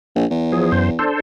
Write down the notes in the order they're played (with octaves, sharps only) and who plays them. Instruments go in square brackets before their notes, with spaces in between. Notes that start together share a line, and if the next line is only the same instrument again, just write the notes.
[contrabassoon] A#1
E2
[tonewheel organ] F3 G#4
F#2 C5
D4 A4 C5